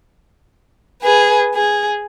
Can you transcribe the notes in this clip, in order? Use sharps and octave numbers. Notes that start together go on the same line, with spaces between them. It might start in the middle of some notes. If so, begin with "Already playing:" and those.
G#4 B4
G#4